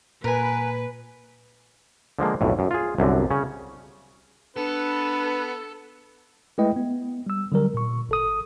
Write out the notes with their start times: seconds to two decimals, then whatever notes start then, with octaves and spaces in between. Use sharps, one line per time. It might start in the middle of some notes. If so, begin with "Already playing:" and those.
0.24 A#2 A#4 B4 G#5
2.19 D3 F3 G#3 A#3
2.41 B1 F2 A2
2.59 F#2
2.71 F4 G#4
2.98 C2 F#2 D3
3.30 C#3 C#4
4.57 B3 D4 A4 B4
6.58 G#3 A3 E4 B4 D#5 G5
6.76 B3
7.26 G3 E6
7.52 D3 F#3 G3 A#4
7.74 A#2 C#6
8.09 G#1 A4 D#6